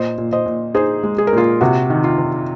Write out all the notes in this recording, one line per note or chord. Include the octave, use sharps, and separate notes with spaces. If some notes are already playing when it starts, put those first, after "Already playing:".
Already playing: A#2 C5 D#5
A#2
C5 D#5
A#2
D#4 G#4 C5
G#3
G#4
A#4
A#2 F4 G#4
C3 F#4
D#3
F4
C3